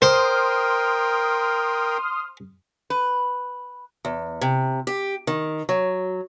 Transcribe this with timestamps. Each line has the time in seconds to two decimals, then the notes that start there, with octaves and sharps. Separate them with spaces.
0.02 A#4 C5 G5 C6 D#6 F6
2.90 B4
4.05 E2
4.41 C3
4.87 G4
5.27 D#3
5.69 F#3